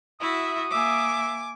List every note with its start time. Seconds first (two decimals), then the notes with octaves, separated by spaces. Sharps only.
0.21 E4 F#4 E5 D#6
0.71 A#3 E5 G#5 D6